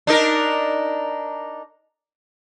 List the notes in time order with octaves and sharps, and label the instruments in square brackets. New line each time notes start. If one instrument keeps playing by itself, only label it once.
[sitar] D4 D#4 A#4